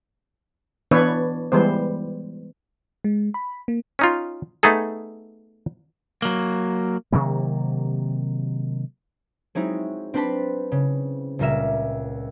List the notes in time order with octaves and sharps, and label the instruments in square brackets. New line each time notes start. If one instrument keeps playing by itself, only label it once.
[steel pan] E3 B3 D4 B4 C#5
E3 G3 G#3 B3 C5
[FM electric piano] G#3
B5
A#3
[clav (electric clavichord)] C#4 D#4 F4
A3 B3 D#4 G#4 A4
[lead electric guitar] F#3 A#3
[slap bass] C3 D#3 F#3 A#3
[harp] F#3 G#3 C4 D#4 E4
C4 D4 B4 C5 A5 B5
C#3
C#2 A#2 G3 A#4 E5 E7